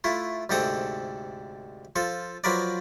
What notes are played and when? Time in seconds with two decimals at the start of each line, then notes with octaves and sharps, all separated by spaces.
0.04 A3 E4 F4
0.49 D2 G#2 C3 C4 A4 D#6
1.96 F3 F4 A4
2.44 F3 F#3 F4 A#4 B4 D5